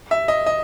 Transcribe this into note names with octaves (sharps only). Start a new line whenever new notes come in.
E5
D#5
D#5